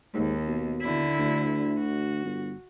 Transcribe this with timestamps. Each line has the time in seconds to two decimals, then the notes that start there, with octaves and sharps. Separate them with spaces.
0.14 D#2 G#2
0.47 B2
0.82 D3 E4
1.19 D2
1.78 F#4
2.25 G1